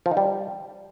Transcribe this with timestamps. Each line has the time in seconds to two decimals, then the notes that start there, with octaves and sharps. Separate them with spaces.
0.06 F3
0.11 D#4
0.17 G3